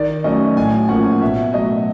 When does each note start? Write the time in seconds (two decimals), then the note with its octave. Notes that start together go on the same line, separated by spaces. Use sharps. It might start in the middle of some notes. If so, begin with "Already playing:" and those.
Already playing: D#3 D5
0.24 F#3 A3 C#4 D#5
0.57 A2 G#5
0.89 F3 A#3 C#4 F#5
1.22 B2 E5
1.54 F#3 A3 D#5